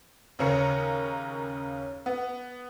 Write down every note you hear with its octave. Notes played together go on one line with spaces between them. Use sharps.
D#2 C#3 C#4 A#4 C#7
B3